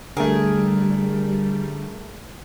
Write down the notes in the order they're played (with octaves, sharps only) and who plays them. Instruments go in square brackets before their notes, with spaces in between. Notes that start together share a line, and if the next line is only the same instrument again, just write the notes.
[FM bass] D3 [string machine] G3 [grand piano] A3 A#4 [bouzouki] G#4